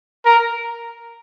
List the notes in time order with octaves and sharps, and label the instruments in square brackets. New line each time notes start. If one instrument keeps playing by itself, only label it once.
[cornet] A#4